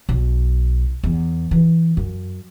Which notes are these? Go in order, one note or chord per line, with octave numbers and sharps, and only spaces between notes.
B1
E2
E3
F#2